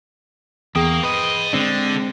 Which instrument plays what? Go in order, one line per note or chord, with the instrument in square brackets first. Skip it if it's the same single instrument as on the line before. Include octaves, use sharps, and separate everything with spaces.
[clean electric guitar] E2 [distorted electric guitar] A#3 [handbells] G#4 G5 D#6
[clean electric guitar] B4 [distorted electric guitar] C5 D#5
[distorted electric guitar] D3 [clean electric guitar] G#3 C4 D4